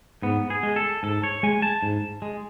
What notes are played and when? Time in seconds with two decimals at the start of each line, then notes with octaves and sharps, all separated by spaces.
0.22 G#2 B3
0.50 G#4
0.63 G#3
0.76 A4
1.03 G#2 A4
1.23 C#5
1.43 G#3 G#5
1.62 A5
1.83 G#2
2.22 G#3